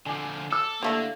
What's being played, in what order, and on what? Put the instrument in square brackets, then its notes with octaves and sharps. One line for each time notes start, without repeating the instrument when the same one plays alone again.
[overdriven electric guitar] D3 F3 [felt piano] G#5 D6
[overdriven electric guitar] A4 [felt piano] D6 E6
[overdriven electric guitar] D3 [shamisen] G3 A3 E4 [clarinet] A#3